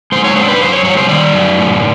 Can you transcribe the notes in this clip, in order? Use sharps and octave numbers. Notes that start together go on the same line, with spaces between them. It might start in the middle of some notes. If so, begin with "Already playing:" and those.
G#3 C5
C#5
D4 C5
B4
F#2 C5
C#5
G3 C#5
C5
D#3 D5
F#2
A2